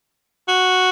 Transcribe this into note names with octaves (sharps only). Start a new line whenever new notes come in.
F#4